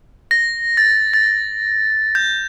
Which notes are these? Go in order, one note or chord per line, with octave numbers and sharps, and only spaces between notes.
A#6
A6
A6
A#6
G6